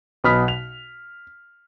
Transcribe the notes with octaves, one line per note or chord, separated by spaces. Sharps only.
B1 B2 B5 D#6 F6 B6
F7